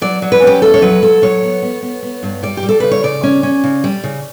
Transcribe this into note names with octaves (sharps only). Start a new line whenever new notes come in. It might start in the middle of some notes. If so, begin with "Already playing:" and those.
F#3 D5
F#3
B4
C#4 G4
E2 A4
C#5
F#3 B4
F#3 A4
F#3 C#5
B3
B3
B3
B3
G2
G3 D5
G4
G3
A4
C#3 B4
C#5
C#3 D5
C#4
C#4
C#3
G3
C#3